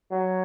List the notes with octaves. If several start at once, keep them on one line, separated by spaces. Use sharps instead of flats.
F#3